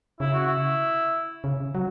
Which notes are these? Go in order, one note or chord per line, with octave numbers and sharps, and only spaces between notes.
C#3 E4
F#4
E4
C#3
F#3